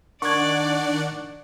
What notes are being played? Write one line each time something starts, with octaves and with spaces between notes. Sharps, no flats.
D#3 D4 D5 F#5 C#6 G#6